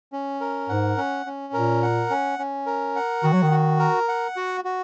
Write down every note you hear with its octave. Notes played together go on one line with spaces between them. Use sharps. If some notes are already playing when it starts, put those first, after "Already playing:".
C#4
A#4
G#2 F#5
C#4
C#4
A#2 A#4
F#5
C#4
C#4
A#4
F#5
D#3 F#4
F#3
D#3
F#4
A#4
F#5
F#4
F#4